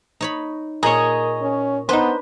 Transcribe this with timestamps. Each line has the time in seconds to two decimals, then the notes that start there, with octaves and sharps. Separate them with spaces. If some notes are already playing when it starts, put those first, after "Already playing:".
0.21 D#4 C#5 B5
0.83 A#2 G#4 C#5 D#5 A#5
1.41 C#4
1.89 B3 D4 D#4 B4 C5